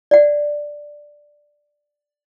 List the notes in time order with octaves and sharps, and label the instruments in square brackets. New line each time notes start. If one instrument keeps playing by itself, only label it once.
[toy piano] D5 F#5